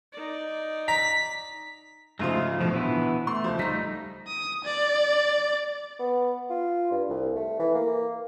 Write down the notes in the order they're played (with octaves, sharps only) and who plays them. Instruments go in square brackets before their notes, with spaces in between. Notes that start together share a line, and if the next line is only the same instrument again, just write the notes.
[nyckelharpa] D#4 D5
[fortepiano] A#5 [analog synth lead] B6
[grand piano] G#2 C#3 F3 [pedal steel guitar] G#3 A3 F4
[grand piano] A#1 B2 D3 [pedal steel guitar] F3
[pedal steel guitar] E3 B3 E4
[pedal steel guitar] A3 [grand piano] C6
[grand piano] C#2 F3
[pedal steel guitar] G3 A3 D#4 [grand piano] A#5 B6
[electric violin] D#6
D5
[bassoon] B3
F4
G2
C2
A3
E3
A#3